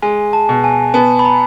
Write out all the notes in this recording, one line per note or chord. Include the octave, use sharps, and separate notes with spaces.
G#3 G#5
A5
B2
G#5
B3 A5
B5
A#5